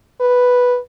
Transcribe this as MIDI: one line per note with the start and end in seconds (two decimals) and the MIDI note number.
0.20 0.78 71